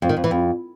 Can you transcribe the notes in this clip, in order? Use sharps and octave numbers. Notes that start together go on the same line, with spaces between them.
F2
D#3
F2
E3
F2